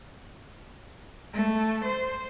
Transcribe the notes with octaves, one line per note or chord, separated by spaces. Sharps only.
A3
C5